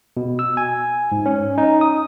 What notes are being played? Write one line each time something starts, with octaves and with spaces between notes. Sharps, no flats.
B2
E6
G#5
G#2
C#4
D#4
D#6